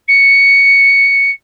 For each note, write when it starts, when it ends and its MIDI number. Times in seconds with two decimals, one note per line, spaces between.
0.08 1.30 97